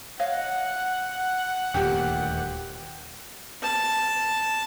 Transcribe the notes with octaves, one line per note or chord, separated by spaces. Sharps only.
C#5 D#5 F5 F#5
D#1 D2 A#2 G4
A5